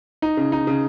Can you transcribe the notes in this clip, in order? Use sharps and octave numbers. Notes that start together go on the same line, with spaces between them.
D#4
C#3
D#4
C#3